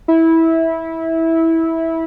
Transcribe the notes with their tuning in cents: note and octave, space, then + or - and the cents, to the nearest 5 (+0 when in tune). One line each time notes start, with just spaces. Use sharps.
E4 -15